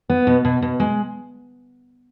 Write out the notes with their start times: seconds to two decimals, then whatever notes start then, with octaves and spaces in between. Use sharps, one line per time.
0.10 B3
0.27 B2
0.45 B2
0.62 B2
0.80 G#3